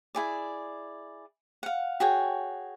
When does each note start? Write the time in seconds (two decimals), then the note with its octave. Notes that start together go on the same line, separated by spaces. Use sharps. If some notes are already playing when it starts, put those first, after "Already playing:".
0.15 E4 G#4 D5
1.63 F5 F#5
2.00 F#4 G#4 C#5 G5